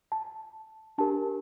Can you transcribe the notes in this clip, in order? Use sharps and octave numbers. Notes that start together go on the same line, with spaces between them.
A5
D4 G4 A#4 A5